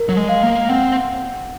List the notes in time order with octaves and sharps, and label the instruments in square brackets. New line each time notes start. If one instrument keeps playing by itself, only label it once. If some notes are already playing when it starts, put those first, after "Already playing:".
Already playing: [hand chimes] A#4
[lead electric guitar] F#3
G#3
[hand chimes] F5
[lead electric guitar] A#3
[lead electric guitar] C4 [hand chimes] F#5